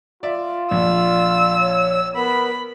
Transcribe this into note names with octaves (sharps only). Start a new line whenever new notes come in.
F4 D5 E5
A#1 D5 E6
C#5
B3 A#4 B5